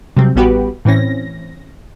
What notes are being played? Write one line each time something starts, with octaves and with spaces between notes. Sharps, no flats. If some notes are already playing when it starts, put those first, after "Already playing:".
C3 F#3 G3 C4
A1 G3 B3 F#4 G4 B4
A2 E3 C4 C#4 A#6